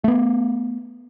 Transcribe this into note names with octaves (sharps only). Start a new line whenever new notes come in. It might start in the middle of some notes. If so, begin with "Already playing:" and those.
A3 B3